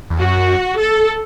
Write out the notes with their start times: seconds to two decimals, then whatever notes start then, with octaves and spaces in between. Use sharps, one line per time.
0.10 E2
0.20 F#2 F#4
0.78 A4